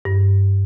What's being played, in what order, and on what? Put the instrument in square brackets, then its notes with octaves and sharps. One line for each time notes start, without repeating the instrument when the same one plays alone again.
[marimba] G2